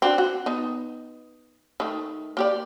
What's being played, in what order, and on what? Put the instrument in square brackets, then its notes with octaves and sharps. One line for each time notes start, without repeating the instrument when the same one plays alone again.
[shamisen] C4 D4 F#4
F#4
B3 D#4
D#3 A3
A#3 G4 D5